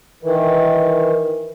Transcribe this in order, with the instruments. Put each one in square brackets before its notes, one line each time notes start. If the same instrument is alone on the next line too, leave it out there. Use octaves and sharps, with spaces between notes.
[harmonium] D#3 E3